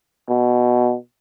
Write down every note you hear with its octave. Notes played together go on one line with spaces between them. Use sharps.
B2